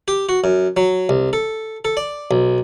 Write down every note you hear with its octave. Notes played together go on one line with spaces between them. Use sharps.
G4
F#4
F#2
F#3
C2
A4
A4
D5
B1